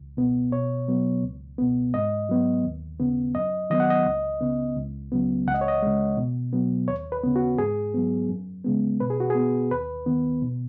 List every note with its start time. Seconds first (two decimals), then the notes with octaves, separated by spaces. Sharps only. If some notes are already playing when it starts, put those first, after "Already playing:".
Already playing: C#2
0.17 B2 B3
0.52 B2 C#5
0.88 F#3 B3
1.23 C#2
1.58 B2 B3
1.94 G#2 D#5
2.29 F#3 B3
2.65 D#2
3.00 C#3 B3
3.35 F#2 D#5
3.70 D#3 F#3 B3 D#5
3.80 F#5
3.90 D#5
4.06 C#2
4.41 C#3 B3
4.76 C#2
5.12 C#3 F#3 B3
5.47 C#2 F#5
5.54 D#5
5.61 C#5
5.68 D#5
5.82 C#3 G#3
6.17 B2
6.53 F#3 B3
6.88 D#2 C#5
7.12 B4
7.23 C#3 B3
7.36 F#4
7.58 G#2 G#4
7.94 F#3 B3
8.29 F#2
8.64 C#3 G#3 B3
9.00 B2 B4
9.10 G#4
9.20 F#4
9.30 B3 G#4
9.71 D#2 B4
10.06 D#3 B3
10.42 B2